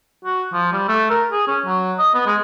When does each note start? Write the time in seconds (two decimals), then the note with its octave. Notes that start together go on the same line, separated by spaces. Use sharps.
0.25 F#4
0.53 F3
0.73 G3
0.88 A3
1.10 A#4
1.32 G#4
1.48 C#4
1.66 F#3
1.99 D#5
2.14 B3
2.26 G#3